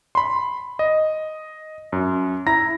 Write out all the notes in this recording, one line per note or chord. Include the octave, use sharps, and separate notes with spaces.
B5 C6
D#5
F#2
E4 A#5 A#6